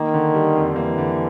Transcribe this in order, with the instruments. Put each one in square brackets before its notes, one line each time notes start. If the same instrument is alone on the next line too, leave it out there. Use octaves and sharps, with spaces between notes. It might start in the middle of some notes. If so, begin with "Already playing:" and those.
Already playing: [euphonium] D#3 [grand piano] A#3
[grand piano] D3
G3
F2
[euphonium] E3 [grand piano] A#3
[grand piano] D3